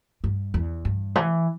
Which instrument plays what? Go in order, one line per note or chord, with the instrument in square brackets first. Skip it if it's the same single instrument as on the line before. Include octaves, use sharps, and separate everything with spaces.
[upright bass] G2
E2
G2
E3